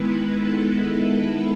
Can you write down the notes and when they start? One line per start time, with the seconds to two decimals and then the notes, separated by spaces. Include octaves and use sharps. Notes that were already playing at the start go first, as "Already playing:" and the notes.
Already playing: D#3 G#3 B3 E4 B4
0.36 A4